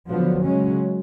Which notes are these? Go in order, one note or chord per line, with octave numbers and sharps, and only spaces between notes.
D3 F3 F#3 B3
C#3 G#3 C#4